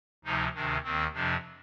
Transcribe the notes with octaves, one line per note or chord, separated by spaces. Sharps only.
D2 C3 F3 D#4
D2 C3 D#3 D4
D#2 D#3 C4
F2 C3 F3 D4